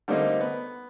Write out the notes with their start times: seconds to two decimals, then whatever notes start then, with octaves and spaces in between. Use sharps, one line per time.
0.08 D3 G3 A3 A#3 C4 D#4
0.40 B3